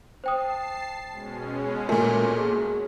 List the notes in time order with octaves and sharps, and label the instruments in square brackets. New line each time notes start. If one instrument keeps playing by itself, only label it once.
[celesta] C5 G5 D#6 [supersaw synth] A5 C7
[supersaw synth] B2 G#3 C#4
[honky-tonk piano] A#2 A3 [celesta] A#4 G#5
[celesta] G#4